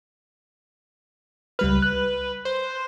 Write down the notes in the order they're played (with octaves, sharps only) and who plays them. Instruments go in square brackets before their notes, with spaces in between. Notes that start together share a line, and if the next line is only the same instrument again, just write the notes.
[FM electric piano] C#2 G3 F6 [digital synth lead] B4
[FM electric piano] F#6
[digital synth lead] C5